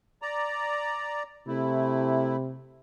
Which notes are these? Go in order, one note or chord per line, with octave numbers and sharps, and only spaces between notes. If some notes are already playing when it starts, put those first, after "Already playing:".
D5 A#5
C3 A3 E4